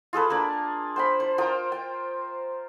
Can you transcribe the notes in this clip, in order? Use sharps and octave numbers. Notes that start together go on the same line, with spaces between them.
F4 G#4 A4 B4
A#3 D4 D5
C5 G5 B5
C5
F4 A#4 G5 D#6
G5